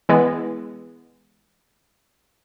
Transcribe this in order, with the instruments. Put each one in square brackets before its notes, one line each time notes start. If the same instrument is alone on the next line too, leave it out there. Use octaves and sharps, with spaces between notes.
[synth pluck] E3 G#3 B3